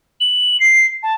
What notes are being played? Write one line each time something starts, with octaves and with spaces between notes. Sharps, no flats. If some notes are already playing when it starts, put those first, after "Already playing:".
F#7
C7
A5